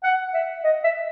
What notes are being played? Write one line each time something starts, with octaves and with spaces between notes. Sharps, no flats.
F#5
E5
D#5
E5